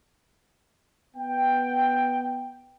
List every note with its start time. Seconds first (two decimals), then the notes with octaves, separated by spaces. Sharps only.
1.16 B3 G5